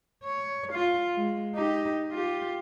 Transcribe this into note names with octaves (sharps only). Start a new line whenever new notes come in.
C#5
F4
G#3
D#4 G4
F4 G4